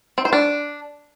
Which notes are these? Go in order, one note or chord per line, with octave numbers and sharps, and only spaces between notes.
C4
C5
D4